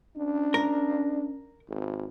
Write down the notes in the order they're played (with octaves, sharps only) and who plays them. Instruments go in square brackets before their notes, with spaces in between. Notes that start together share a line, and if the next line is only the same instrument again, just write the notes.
[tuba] C#4 [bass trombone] D4
[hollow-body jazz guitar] A#4
[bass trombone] G#1